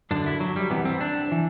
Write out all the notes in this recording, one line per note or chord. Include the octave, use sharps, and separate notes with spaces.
F#2 D3 D4
E4
F#3
G3
C2 C3 E3 B3
C4
D4
E3